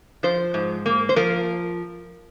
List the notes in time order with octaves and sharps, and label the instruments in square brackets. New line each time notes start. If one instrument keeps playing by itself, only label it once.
[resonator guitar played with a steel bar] F3 C5
G#2
A#3
C5
F3 A#4